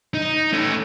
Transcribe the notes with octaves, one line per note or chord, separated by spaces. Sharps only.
D#4
A3 C#4